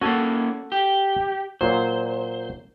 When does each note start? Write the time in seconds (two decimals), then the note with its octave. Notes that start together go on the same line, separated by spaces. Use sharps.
0.01 A#3 C#4 F#4 A4
0.72 G4
1.61 A#2 F#3 C5